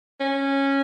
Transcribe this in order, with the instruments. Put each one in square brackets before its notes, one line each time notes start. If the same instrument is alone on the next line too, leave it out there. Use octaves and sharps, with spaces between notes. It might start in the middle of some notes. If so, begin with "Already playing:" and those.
[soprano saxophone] C#4